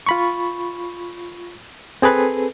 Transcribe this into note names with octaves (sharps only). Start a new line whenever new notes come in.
F4 B5 C#6
C4 G#4 A4 B4